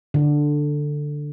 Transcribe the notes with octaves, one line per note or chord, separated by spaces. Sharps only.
D3